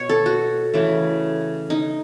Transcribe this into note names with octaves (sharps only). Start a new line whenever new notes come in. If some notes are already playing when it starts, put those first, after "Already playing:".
Already playing: B2 C#5
A4
F#4
C#3 E3 A3
D#4